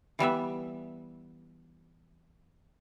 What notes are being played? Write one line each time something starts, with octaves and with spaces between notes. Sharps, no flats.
E3 G3 B3 E5